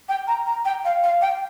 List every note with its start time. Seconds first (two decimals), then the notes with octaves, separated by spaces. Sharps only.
0.09 G5
0.28 A#5
0.46 A#5
0.65 G5
0.85 F5
1.03 F5
1.22 G5